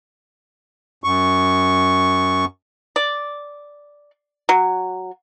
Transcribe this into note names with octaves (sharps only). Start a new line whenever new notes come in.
F#2 C#6
D5
F#3